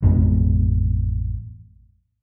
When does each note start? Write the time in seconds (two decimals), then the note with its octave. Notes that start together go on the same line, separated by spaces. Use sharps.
0.03 A1 F2 B2 G#3